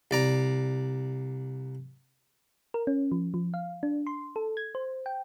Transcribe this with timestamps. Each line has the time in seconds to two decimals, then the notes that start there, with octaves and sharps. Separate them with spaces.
0.11 C2 D5 A#5
2.74 A#4
2.87 C#4
3.12 F3
3.34 F3
3.54 F5
3.83 D4
4.07 C6
4.36 A4
4.57 G#6
4.75 C5
5.06 G5